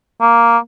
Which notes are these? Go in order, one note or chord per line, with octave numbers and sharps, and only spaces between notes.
A#3